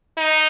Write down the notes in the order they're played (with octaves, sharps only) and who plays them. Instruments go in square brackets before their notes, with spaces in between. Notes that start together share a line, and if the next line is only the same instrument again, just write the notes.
[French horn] D#4